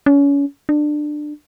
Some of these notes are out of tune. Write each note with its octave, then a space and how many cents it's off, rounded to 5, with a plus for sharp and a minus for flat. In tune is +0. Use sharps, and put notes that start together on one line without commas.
C#4 +30
D4 +20